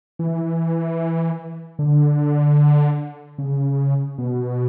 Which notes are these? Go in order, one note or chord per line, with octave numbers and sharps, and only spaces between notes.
E3
D3
C#3
B2